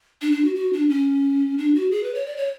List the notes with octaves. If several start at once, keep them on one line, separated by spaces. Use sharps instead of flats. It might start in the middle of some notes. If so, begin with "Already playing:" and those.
D4
D4
F#4
F#4
D4
C#4
D4
F#4
G#4
B4
C#5
D5
C#5